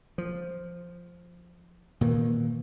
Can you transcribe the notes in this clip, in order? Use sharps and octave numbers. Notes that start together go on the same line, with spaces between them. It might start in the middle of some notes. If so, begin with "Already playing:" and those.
F3
A#2 D#3 E3